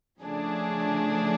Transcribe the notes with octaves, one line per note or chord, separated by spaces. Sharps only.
C#3 F3 A3 D4 G#4